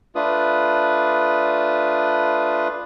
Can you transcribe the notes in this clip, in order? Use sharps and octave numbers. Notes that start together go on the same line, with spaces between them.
A3 D4 F4 B4 D#6